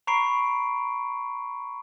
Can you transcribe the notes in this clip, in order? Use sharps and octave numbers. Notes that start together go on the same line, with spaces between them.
A#5 B5 C#6 C7 D7